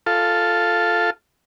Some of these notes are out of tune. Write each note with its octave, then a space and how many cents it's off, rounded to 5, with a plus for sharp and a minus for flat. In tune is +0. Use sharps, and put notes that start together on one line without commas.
F4 +0 A4 +0